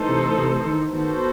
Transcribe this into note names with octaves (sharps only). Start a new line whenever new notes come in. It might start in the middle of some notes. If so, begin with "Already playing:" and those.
Already playing: E3 A3 D#4 A4 C5
C3
C3
D#3
D#3 B3 F#4 A4 C5